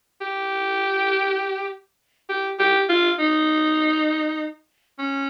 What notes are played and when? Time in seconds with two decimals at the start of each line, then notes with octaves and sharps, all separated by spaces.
0.21 G4
2.29 G4
2.59 G4
2.89 F4
3.19 D#4
4.99 C#4